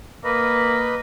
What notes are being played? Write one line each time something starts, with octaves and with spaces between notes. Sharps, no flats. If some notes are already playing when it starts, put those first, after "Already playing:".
A#3 B4 D#5